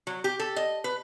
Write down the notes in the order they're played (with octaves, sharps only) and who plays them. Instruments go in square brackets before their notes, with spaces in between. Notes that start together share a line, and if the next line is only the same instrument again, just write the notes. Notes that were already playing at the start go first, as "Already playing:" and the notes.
[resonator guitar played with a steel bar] F#3
G4
A4
D#5
B4